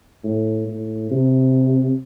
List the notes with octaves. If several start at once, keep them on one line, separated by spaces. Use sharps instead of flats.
A2
A2
C3